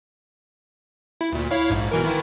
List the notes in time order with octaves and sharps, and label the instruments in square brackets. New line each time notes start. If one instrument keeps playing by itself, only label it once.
[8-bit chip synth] E4
D2 A#2
E4 C#5 F5
A#1 G#2
B2 E3 A#4
D#3 E3 E4